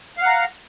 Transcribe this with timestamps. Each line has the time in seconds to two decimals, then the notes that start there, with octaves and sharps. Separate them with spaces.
0.17 F5
0.22 F#5
0.26 A#5